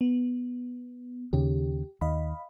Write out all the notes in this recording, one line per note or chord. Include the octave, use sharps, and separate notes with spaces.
B3
D#2 C#3 G4
D#2 D#5 F5 B5